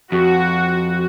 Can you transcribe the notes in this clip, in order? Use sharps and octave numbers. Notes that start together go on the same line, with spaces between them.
F2 F#4